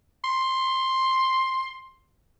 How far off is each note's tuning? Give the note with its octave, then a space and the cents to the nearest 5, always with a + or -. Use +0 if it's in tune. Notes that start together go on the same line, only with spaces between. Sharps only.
C6 +10